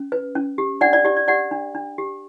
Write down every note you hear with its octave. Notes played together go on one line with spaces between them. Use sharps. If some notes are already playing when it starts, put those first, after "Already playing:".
Already playing: C#4
B4
C#4
G4
D4 D5 F#5
D5
G4 D5
D5
G4 D5 F#5
D4
D4
G4